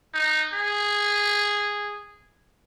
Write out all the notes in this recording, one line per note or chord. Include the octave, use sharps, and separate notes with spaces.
D#4
G#4